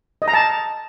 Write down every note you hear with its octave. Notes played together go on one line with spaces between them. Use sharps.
D#5
A#5
A5